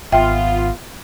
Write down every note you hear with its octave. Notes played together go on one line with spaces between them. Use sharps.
G#1 B3 F4 E5 G5